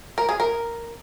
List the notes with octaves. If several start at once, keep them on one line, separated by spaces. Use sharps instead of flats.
A#4
G#4
A#4